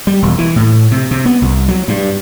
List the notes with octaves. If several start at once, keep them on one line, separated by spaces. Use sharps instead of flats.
G3
E1
E3
A2
C3
C3
B3
C2
F#3
G2